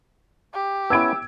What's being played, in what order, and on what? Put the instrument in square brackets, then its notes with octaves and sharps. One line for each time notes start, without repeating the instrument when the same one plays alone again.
[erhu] G4
[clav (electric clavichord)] B3 C#4 E4 [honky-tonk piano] E6 G#6 D7